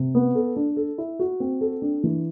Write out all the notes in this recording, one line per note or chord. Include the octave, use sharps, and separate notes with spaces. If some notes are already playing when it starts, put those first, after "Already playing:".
Already playing: C3
B3
A4
D4
A4
E4
F#4
C4
A4
D4
E3